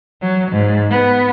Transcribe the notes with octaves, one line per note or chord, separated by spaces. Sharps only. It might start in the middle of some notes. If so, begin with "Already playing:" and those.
F#3
G#2
B3